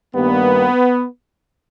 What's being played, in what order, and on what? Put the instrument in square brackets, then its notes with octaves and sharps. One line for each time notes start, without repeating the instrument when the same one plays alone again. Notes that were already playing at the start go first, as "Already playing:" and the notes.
[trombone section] G2 D#3 G3 A#3 B3